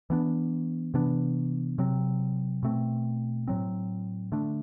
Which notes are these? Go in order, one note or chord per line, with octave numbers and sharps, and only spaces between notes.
E3 B3 D4
C3 E3 B3 D4
C3 F#3 C4
B2 A3 C4
A2 F#3 C4
D3 A3 D4